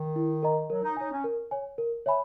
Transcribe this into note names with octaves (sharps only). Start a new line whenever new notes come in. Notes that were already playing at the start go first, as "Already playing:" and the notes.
Already playing: D#3
E4
A#4 D#5 A#5
F#3 A#4
D#4
D#4 C#5 G#5
C#4
A#4
C#5 G#5
A#4
C#5 E5 G#5 B5